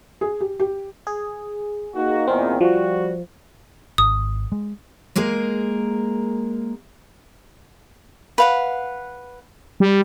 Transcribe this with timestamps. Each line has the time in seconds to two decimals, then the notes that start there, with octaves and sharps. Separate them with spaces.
0.21 G#4
0.41 G4
0.60 G4
1.07 G#4
1.95 A#3 D#4 F#4
2.27 E2 A#2 D#3 C4
2.61 F3 G3 F#4
3.98 G#1 D#6
4.52 G#3
5.16 G#3 A#3 G#4 A#4
8.38 B4 F5 F#5
9.80 G3